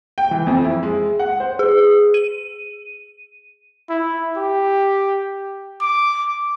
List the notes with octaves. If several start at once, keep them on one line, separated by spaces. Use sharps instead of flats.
G5
E3
F2
E4
G#3
F#5
C5
G#4
D#7
E4
G4
D6